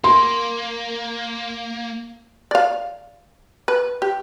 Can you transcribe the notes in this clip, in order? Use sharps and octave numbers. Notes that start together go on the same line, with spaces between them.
A#3 C6
D5 F5
B4
G4